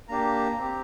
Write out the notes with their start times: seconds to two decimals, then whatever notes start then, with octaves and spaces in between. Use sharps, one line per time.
0.09 A#3 D4 G4 A#5
0.58 C4 G4